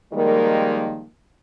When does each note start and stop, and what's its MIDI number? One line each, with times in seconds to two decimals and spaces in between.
0.13 1.04 51
0.13 1.04 53
0.13 1.04 55
0.13 1.04 56
0.13 1.04 58